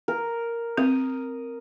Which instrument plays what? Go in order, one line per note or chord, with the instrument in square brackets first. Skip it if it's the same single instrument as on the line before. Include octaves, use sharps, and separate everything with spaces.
[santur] A#4
[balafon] C4 [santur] D#6